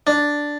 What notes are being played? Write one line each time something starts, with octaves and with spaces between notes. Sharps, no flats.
D4